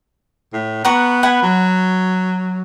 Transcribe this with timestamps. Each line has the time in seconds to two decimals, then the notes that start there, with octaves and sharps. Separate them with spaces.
0.53 A2
0.85 B3 F#5 A#5 C#6
1.23 F#5 G#5 B5
1.43 F#3